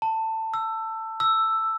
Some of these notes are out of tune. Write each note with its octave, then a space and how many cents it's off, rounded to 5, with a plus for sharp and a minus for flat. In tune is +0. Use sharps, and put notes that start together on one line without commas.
A5 +20
E6 +15
E6 +5